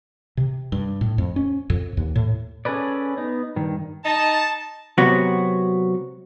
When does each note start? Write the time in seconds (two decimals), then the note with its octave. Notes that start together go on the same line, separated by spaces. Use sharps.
0.37 C3
0.72 G2
1.01 A2
1.18 F2
1.36 C#4
1.70 F2
1.97 D#2
2.16 A2
2.65 C#4 G#4 A4 B4 D5
3.17 B3 D#4
3.56 G2 D#3
4.05 D#4 A5
4.98 C3 F#3 B3 F#4